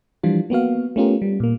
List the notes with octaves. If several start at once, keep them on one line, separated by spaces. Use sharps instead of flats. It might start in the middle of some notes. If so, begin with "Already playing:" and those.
E3 F3 G3 D4 F4
A#3 B3 F#4 F5
A3 B3 C#4 F4 G4 A#4
G3
A#2 A#3